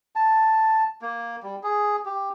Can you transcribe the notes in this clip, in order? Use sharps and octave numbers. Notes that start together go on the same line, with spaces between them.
A5
A#3
G3
G#4
G4